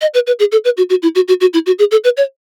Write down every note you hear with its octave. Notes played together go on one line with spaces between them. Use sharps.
D#5
B4
B4
G#4
A4
B4
F#4
F#4
E4
F#4
F#4
F#4
E4
F#4
G#4
A4
B4
C#5